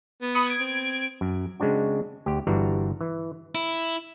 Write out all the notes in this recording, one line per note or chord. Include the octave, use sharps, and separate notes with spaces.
B3
B5 D#6 C#7
G#6 D7
C4
F#2
C#3 G#3 C4 D4 F#4
D2 G4
G1 E3 G3 D4 F#4 A#5
E3
E4